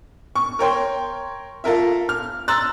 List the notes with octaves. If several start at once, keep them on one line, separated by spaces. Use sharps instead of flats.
C#6
A#4 C#5 G5 C6
F4 A4 A#4 E5
F6
A#5 C6 E6 F#6 A6